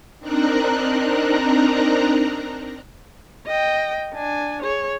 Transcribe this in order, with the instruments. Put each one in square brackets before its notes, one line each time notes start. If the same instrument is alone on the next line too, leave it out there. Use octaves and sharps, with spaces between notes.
[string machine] C4 D4 D#4 A#4 A#5 F#6
[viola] D#5 G5
D4 G#5
G#4 C#5